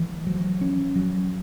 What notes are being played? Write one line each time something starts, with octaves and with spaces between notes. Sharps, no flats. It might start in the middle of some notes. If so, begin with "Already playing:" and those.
Already playing: E3 A3
F#3
C#4
F#3